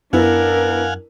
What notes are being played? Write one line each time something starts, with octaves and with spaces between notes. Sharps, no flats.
F#2 B3 D4 E4 A#4 F5 F#5 G#5